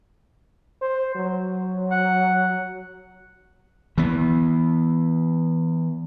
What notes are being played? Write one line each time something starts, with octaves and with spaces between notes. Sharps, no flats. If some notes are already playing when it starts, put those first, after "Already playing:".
C5
F#3
F#5
E3 B3